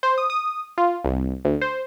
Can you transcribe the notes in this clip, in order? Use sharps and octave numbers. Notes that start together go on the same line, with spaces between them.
C5
D#6
D#6
F4
C2
D2
C5